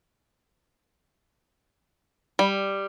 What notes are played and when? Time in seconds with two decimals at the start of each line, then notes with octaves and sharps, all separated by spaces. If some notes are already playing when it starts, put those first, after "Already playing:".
2.39 G3